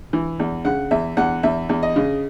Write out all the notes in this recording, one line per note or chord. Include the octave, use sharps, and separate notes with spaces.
E3
E2
C#3 F#5
E2 E5
E2 F#5
E2 E5
E2
D#5
C#3